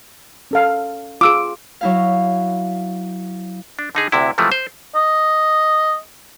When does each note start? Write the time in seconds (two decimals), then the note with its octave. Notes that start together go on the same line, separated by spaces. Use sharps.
0.51 C#4 A4 F5
1.21 F4 G#4 D6 E6 D7
1.81 F#3 E4 F5
3.79 D4
3.95 D3 D#4 G#4
4.12 D2 C3 E4
4.38 C3 E3 F3 G#3 A3
4.52 C5
4.95 D#5